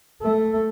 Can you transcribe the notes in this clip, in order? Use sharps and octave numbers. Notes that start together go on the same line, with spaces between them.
A3